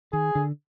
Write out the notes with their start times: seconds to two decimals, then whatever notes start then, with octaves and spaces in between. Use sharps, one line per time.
0.13 D#3 G#4
0.35 D3